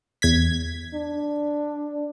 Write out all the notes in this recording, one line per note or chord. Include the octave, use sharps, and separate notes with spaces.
E2 G#6 B6
D4